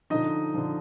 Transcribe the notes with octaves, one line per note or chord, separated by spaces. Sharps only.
D3 F3 D#4 D#5
D3 F3